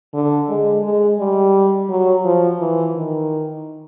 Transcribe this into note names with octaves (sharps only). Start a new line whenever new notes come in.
D3
G#3
G#3
G3
F#3
F3
E3
D#3